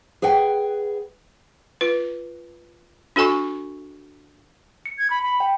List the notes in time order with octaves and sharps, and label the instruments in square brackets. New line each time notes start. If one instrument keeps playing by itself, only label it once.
[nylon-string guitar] G#4 B4 F#5 G5
[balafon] F4 B4
D4 F#4 A4 G#5 C#6
[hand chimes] C#7
[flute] G#6
B5
B5
[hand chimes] G5